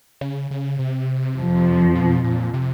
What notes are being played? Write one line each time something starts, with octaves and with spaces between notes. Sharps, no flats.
C#3
C#3
C3
F2 F3
B2
A#2
C3